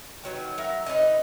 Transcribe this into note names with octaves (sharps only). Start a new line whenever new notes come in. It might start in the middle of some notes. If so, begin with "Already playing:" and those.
D#3 F#3 B4
F#3 E4 A#4
D#4 B4 C#5 D#5